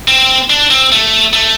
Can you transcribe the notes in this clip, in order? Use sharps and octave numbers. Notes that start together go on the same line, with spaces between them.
C4
D4
C4
A3
A3